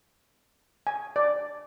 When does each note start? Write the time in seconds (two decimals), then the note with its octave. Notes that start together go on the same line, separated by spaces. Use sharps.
0.87 G#5
1.16 D5